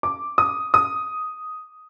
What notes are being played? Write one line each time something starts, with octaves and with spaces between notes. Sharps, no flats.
D6
D#6
D#6